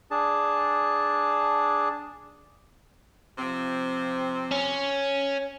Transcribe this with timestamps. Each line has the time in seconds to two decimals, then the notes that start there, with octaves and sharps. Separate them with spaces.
0.11 D4 G#4 A5
3.38 C3 F3 C4
4.52 C#4